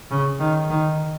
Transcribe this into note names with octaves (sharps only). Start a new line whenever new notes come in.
C#3
D#3
D#3